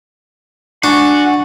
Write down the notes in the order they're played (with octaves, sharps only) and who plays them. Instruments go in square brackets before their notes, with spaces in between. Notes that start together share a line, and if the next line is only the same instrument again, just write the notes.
[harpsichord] D4 [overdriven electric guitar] F#4 [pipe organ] F#5 G#5 C#6